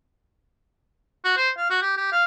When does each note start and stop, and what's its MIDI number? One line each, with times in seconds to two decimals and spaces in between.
1.25 1.35 66
1.37 1.50 72
1.57 1.67 77
1.70 1.82 66
1.82 1.94 67
1.97 2.10 67
2.12 2.25 77